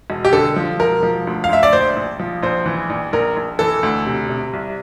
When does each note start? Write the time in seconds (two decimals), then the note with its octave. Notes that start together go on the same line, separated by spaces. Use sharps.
0.10 E1
0.25 G4
0.33 D3 A4
0.56 F3
0.80 E1 A#4
1.03 F3
1.27 D2
1.44 F5
1.49 D2 E5
1.63 D5
1.73 A#1 C5
1.96 A#1
2.20 F3
2.43 A#1 C5
2.66 E3
2.90 A#1
3.13 A#1 A#4
3.36 A#1
3.59 E3 A4
3.83 D2
4.07 C3
4.29 C3
4.53 C2